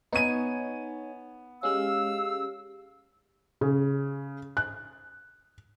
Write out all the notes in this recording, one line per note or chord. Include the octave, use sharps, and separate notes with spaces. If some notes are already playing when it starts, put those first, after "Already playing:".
B3 D#4 C#5 G#5 D#7
G#3 C#4 G4 F5 E6
C#3
F#6